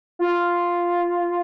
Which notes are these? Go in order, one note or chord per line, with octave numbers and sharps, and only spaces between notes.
F4